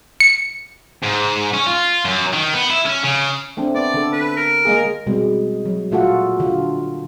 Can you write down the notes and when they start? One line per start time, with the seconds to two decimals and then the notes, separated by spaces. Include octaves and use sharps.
0.20 C#7
1.03 G#2
1.54 C#4
1.66 F4
2.05 F#2
2.33 D#3
2.54 B3
2.70 E4
2.86 C#4
3.03 C#3
3.57 A3 C4 D4
3.75 B3 D5
3.94 D3 A4
4.12 B4
4.37 A#4
4.65 G#3 A#3 G#4
5.07 B2 G3 G#3 C4
5.65 F#3
5.91 A#2 A3 F4 F#4 A4 F#5
6.40 D3 F4